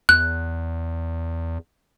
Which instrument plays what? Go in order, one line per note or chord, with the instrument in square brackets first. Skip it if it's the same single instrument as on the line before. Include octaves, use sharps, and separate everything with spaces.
[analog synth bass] E2 [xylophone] F#6